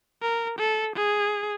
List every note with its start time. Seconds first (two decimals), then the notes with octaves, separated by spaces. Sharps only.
0.22 A#4
0.59 A4
0.96 G#4